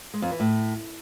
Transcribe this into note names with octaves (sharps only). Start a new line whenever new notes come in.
G#3
F2
E3
A2